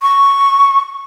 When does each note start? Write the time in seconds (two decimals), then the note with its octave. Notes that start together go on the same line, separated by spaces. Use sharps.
0.02 C#6